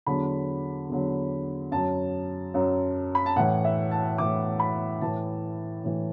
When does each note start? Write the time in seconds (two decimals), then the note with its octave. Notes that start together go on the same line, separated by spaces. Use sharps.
0.06 E2 D3 F#3 B5
0.89 E2 D3 F#3
1.71 F#2 F#3 A5
2.54 F#2 F#3
3.15 B5
3.26 A5
3.36 A2 E3 F#5
3.65 E5
3.91 A5
4.18 A2 E3 D6
4.60 B5
5.01 A2 E3 A5
5.84 A2 E3